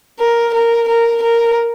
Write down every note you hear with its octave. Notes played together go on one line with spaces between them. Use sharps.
A#4
A#4
A#4
A#4